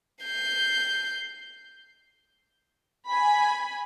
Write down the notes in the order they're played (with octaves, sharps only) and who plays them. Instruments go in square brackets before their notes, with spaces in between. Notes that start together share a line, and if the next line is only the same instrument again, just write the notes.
[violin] G6 C7
[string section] G#5 B5